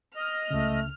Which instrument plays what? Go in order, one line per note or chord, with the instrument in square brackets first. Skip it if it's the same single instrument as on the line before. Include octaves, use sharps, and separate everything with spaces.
[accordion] D#5 [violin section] F6
[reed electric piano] C#2 C#3 [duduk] A3